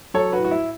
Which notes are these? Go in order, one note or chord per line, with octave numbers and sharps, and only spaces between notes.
F#3 A4 C#5
F#4 B4
A2
F#4
E4